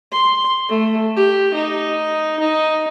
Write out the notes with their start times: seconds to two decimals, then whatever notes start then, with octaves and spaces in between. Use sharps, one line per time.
0.12 C6
0.69 A3
1.16 G4
1.54 D#4
2.40 D#4